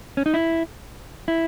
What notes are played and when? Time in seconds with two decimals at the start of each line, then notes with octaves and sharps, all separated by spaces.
0.17 C#4
0.26 D#4
0.34 E4
1.28 E4